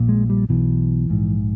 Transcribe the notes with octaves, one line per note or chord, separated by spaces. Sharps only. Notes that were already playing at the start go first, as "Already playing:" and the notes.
Already playing: A#1 A#2
G#3
G3
B1 B2 E3
A#1 G#2